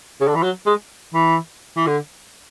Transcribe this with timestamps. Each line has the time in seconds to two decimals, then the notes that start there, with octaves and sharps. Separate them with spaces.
0.21 C#3
0.28 D3
0.35 E3
0.43 F#3
0.66 G#3
1.14 E3
1.77 E3
1.87 D3